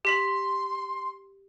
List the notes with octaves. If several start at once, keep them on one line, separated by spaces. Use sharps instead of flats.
G4 C6 B6 F#7